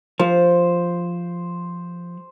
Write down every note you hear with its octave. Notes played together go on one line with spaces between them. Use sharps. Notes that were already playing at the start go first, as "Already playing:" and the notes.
F3 C5